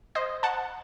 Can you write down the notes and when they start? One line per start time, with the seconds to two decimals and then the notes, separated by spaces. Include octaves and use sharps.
0.15 C5 D#5
0.43 F#5 A5